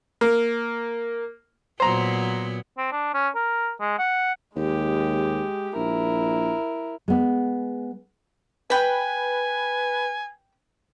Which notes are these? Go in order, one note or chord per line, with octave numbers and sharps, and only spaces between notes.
A#3
A#2 F#3 B3 C5 A#5
C4
D4
C#4
A#4
G#3
F#5
D#2 G#3 G4
A#1 E4 A#4
G#3 B3
B4 G5 G#5 B5